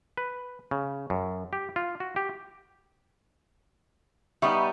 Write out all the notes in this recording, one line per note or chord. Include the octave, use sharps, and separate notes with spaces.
B4
C#3
F#2
G4
F4
F#4
G4
G3 B3 D#4 E5 C#6